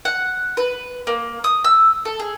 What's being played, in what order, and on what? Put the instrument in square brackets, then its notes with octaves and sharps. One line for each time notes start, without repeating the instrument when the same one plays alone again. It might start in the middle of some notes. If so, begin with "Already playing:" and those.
[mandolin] F#5
B4
A#3
D#6
E6
A4
G#4